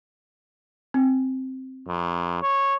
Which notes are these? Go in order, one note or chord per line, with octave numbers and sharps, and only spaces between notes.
C4
F2
C#5